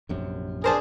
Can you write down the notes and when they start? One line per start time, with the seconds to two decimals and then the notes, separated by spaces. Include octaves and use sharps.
0.09 A#1 F#2 C3
0.64 D4 G#4 A#4 C5 A5